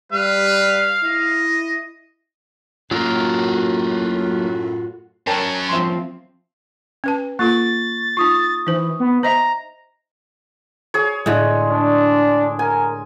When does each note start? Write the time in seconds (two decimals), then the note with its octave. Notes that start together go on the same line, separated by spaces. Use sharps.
0.12 G3 B4 F5
1.04 E4 D#5
2.91 F#2 A2 F#3 A#3 F4 F#4 A#4
5.27 F#2 F#3 A#4 G5 A5
5.69 F3 C4 E5 C6
7.04 C#4 B4 A5
7.39 A#3 F4 A4 C#6 A6
8.17 D#4 F4 C#6 D#6
8.67 E3 D#4 C5
9.00 B3
9.23 C5 D#5 E5 A#5
10.94 G#4 C#5
11.26 A2 D3 G#3
11.71 D4
12.59 A#4 G#5